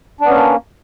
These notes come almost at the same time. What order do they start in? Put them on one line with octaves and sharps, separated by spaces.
D4 B3 C#4 A#3